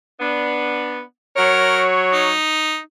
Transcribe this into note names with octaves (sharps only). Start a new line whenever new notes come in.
B3 D4
F#3 A#4 C#5
D#4